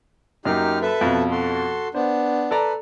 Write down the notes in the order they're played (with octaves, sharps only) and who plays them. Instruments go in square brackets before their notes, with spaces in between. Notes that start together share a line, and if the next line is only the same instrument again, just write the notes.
[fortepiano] F#2 A#3 [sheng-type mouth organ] D#4 G4 F6
[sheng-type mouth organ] A4 B4 E5
[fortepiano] F2 B2
[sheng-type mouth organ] F#4 A4 C6
[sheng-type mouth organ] B3 D4 [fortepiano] C5
[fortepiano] A4 D5 A#5 [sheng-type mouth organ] B4